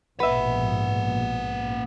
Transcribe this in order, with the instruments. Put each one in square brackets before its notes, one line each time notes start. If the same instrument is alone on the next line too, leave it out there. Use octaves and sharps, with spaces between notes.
[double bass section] A#1 G#2 B2 [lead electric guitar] A#3 F#5 [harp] B4 E5